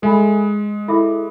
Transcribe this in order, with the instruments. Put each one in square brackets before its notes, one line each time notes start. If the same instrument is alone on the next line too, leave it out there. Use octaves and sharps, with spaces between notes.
[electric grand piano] G#3 [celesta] A4 E5 G#5 B5
[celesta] E4 A4 E5 B5 D6